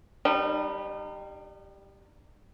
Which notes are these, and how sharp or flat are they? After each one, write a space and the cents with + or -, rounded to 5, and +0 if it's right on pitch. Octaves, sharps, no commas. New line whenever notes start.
G3 +0 D#4 -40